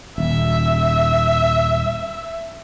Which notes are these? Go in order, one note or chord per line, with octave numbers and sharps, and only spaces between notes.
D#1 E5